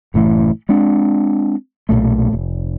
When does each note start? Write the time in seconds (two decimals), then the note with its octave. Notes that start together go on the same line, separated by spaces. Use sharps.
0.14 F#1 A2 E3 A3
0.69 G#3 C4 D4
1.89 B1 F2 A#2 A3
2.33 F1